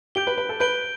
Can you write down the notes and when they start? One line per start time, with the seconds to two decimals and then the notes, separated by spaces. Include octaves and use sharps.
0.15 G4 G6 D7 G7
0.27 B4
0.38 B4
0.49 A4
0.60 B4 G6 D7 G7